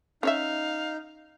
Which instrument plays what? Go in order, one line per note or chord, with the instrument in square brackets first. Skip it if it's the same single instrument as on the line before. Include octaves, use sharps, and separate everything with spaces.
[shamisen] C#4 C#5 E5 [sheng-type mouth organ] D#4 [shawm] F5